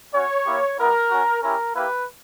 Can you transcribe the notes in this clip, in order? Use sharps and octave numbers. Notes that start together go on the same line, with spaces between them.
C#4 F#4 C#5
A#3 E4 G4
G3 B3 E4 A#4
C#4 F#4
C#4 E4 G4 A#4
A#3 E4 G4 B4